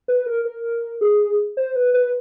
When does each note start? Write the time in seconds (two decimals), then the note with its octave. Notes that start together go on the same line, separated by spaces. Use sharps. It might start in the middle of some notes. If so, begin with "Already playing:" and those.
0.08 B4
0.26 A#4
0.45 A#4
1.01 G#4
1.57 C5
1.76 B4
1.94 B4